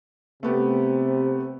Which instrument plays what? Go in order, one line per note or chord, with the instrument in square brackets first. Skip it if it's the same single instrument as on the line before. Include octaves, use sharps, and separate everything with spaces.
[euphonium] C3 [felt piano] A3 B3 G4